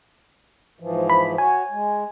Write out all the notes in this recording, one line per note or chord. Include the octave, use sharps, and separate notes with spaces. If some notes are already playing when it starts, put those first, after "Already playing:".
G#2 E3 F3
B5
F#4 C#5 G#5
G#3